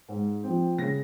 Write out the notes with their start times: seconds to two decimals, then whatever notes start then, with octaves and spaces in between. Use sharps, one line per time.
0.08 G#2
0.43 F3 C4
0.78 C#3 A#6